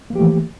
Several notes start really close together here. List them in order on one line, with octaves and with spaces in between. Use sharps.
A#3 F3 G4 A3 E3